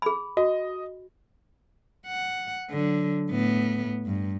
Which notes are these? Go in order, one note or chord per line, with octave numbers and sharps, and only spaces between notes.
G#4 B5
F#4 D#5
F#5
D3 F#3
A2 B3
G2